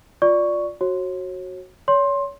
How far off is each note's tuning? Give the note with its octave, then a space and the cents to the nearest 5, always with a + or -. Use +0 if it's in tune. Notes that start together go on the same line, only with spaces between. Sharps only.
F4 +15 D5 +0 C#6 +5
F#4 +0 C#5 -35
C#5 +30 C6 +15